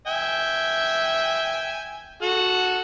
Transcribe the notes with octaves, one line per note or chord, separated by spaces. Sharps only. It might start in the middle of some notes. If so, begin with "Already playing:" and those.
E5 G5 G#5
F#4 A4 F#5